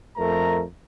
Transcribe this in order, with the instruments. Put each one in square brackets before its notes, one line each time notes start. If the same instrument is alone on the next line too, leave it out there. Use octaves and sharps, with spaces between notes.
[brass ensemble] F2 A3 A#4 A#5